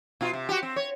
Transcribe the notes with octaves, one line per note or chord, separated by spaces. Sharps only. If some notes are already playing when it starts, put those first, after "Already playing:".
B2 F4
C3
F#4 G4
C4
C#5